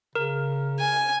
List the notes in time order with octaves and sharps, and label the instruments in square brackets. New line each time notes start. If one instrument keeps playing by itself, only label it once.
[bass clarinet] C#3 [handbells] A#4
[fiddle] G#5